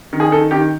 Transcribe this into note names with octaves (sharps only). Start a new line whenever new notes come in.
D#3
G#4
D#3 A4
D#3 G4